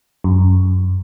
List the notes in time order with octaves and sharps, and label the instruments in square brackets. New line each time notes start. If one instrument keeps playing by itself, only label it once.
[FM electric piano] F#2